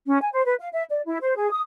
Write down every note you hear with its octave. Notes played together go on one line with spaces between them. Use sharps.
C#4
G#5
C5
B4
F5
E5
D5
E4
C5
G#4
D#6